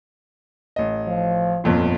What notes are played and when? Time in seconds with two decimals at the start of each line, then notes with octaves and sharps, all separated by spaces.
0.76 A1 D#5
1.08 F3
1.64 G1 F2 A#2